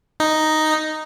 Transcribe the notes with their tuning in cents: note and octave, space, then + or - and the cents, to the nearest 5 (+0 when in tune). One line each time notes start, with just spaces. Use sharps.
D#4 +0